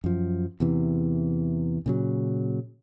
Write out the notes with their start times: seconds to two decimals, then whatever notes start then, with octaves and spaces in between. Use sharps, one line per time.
0.04 F#2 F3
0.60 E2 C3 E3
1.86 A#2 C#3 F#3